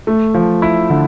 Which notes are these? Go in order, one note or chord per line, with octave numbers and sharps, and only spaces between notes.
A3
F3
E4
D3